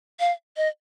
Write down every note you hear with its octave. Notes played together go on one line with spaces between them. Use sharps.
F5
D#5